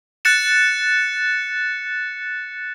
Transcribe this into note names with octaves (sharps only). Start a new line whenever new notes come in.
F#6 A6 C#7 E7